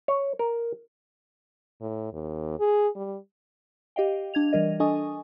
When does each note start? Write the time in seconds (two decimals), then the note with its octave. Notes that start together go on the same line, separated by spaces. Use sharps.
0.08 C#5
0.39 A#4
1.81 A2
2.13 D#2
2.59 G#4
2.96 G3
3.96 G4 D#5 F5 G5
4.34 D4 G#6 F7
4.53 E3 G3 A#4 D#5
4.80 D4 A4 D#5 G#5 C#6 D#6